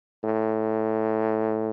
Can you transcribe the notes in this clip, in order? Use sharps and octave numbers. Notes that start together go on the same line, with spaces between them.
A2